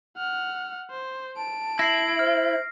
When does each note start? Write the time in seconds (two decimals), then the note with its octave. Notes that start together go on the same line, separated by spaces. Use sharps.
0.17 F#5 F6
0.90 C5
1.37 A5 D7
1.79 E4 A#6 C7
2.19 C5 F6